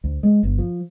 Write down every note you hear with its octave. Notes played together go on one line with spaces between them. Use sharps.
D2
G#3
G1
F3